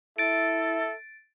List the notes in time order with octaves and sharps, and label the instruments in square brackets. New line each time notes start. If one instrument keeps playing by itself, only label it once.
[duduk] E4 [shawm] A4 [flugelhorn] E5 [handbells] A6 D7